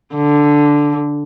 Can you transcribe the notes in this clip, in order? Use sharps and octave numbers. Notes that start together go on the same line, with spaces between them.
D3